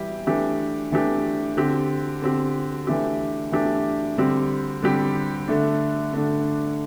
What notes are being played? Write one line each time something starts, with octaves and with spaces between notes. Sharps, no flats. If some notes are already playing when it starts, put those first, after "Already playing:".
Already playing: E3 G3 E4 G4
E3 A3 D4 G4
E3 A3 D4 G4
D3 C4 G4
D3 C4 G4
E3 A3 D4 G4
E3 A3 D4 G4
D3 G3 C4 G4
D3 G3 C4 G4
D3 A3 D4
D3 A3 D4